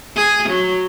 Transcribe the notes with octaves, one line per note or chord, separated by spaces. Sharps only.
G#4
F#3